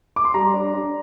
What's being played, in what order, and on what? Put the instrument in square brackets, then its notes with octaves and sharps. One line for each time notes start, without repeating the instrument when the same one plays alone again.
[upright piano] D6
C6
G3 A#5
D4
D4